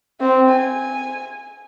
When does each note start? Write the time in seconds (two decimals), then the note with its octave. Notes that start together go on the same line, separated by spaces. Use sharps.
0.21 C4
0.50 G#5